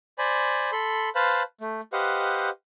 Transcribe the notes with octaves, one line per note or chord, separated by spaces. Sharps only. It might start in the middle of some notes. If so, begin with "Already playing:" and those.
C5 D5 G#5 B5
A4 B5 C6
B4 C5 F5 A5 B5
A3
G4 B4 C5 D#5 F5 F#5